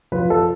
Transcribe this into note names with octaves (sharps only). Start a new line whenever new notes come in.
F3 B4
A4